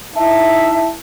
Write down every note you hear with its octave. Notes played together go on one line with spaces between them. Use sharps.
D#4 E4 E5 A5